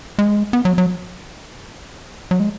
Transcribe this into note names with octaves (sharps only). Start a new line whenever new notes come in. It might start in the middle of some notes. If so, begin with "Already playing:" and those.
G#3
B3
F#3
F#3
F#3
G#3